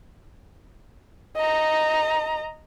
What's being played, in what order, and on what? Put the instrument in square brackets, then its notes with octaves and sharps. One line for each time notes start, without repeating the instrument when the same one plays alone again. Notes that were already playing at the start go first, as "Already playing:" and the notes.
[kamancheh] D#5 A#5